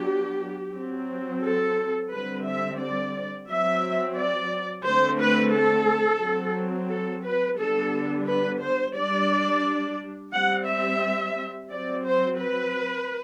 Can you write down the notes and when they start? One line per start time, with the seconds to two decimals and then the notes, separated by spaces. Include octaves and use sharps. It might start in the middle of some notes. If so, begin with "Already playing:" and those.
Already playing: F#3 B3 D4 G4
0.74 F#3 C4
1.43 A4
2.12 D3 G3 C4 B4
2.46 E5
2.80 D5
3.49 F#3 C4 E5
4.17 D5
4.85 D3 A3 C4 C5
5.19 B4
5.54 A4
6.23 F#3 C4
6.90 A4
7.25 B4
7.59 D3 G3 B3 D4 A4
8.27 B4
8.62 C5
8.95 G3 D4 D5
10.32 G3 C4 F#5
10.67 E5
11.69 F#3 C4 D5
12.03 C5
12.38 B4